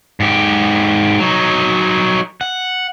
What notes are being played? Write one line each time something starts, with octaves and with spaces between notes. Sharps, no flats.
G#2 G4
F#3 D#4
F#5